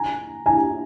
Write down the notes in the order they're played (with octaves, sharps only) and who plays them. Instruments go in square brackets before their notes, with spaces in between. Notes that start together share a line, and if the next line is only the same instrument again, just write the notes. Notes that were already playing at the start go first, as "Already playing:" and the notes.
Already playing: [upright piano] G#5 A#5
G#5 A#5